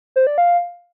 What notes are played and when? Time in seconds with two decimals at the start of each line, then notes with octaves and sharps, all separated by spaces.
0.16 C5
0.27 D5
0.38 F5